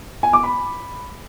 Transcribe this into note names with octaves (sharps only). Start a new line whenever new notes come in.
G#5
D6
B5